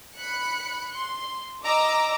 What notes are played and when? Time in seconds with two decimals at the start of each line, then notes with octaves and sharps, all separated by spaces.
0.16 B5 F#6 C#7
0.95 C6
1.65 D#5 A#5 D6 E6